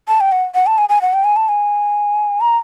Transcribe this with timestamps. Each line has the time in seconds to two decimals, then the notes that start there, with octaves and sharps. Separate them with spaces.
0.08 A5
0.20 G5
0.32 F#5
0.55 F#5
0.67 A5
0.78 G#5
0.89 G#5
1.02 F#5
1.14 G5
1.24 G#5
1.36 A5
1.49 G#5
2.41 A#5